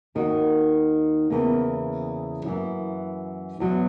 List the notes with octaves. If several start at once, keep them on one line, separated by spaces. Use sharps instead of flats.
D#2 D#3 A#3 D#4 F#4
E2 C#3 E3 A#3
F#2 E3 A#3
E2 B2 F#3